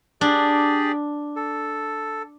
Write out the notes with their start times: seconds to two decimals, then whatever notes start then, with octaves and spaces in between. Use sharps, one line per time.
0.21 D4 G4 G#4 D5
1.36 A4